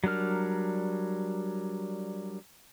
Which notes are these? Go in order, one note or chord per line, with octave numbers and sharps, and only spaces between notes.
F#3 G3 D4 A#4 F6